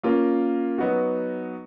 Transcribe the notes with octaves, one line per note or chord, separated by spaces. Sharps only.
A#3 C#4 F4 A#4
F#3 B3 D#4 F#4